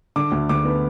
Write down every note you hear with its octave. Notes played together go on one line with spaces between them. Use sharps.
D3 D6
D2
D2 D6
B3